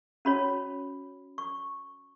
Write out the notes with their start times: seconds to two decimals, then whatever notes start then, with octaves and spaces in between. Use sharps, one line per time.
0.25 C#4 F#4 C#5 B5
1.38 C#6